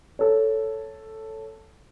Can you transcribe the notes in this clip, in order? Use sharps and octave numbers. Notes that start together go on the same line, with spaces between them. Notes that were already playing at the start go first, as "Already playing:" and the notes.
A4 C#5